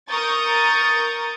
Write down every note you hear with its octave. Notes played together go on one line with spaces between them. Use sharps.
A#4 C#6 D#6 G6 A6